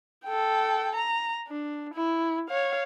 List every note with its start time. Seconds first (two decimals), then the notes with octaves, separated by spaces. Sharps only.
0.25 A4 G5
0.96 A#5
1.48 D4
1.94 E4
2.49 C#5 F5